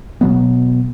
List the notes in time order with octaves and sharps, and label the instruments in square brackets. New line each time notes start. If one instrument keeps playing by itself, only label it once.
[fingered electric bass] B2 F#3 B3